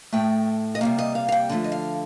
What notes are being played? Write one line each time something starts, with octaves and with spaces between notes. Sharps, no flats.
A2 A3 G5
D#5
C3 G3 A#3 F5
D#5
F5
F5
G5
D3 F3 A3
D#5
F5